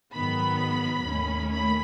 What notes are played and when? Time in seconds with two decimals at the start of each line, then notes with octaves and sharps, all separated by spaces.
0.14 G#2 D#3 F#3 B3 B5
1.05 D#2 D#3 A3 C#4
1.51 B5